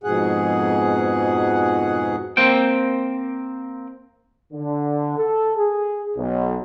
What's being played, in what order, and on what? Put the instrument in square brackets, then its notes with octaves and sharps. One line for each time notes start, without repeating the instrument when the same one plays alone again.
[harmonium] F2 G#2 B2 G#4 F#5
[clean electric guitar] A#3 C4 C5 G5
[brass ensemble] D3
A4
G#4
B1